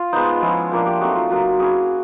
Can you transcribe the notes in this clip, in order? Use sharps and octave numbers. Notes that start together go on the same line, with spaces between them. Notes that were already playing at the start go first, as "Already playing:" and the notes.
Already playing: F4
G#3 B3 D#4 C5
F3 G#3 C#4 E4
F3 A#3 D4 C5
G4
F#3 A3 C4 D#4 F#4
F4
F#3 A#3 D#4 F#4
A#3 C#4 E4 G#4